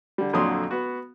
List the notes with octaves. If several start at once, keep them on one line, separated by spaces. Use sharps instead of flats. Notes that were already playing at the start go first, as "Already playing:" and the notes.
D3 G3
F2 A#2 D3 F#3 C6 D#6
B3 F#4